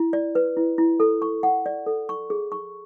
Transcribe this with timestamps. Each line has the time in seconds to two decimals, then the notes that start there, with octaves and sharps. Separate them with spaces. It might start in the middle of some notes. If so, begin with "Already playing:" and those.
Already playing: E4
0.13 D5
0.35 B4
0.57 E4
0.78 E4
1.00 A4
1.22 C#6
1.43 F#5
1.66 D5
1.86 A4
2.09 C#6
2.30 G#4
2.52 C#6